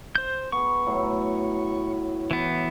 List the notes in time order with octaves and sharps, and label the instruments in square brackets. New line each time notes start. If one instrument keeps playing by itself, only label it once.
[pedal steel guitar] C5 G6
[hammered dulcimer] B3 G#4 [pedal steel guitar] C#6
[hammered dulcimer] A2 F#3
[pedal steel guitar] E3 B3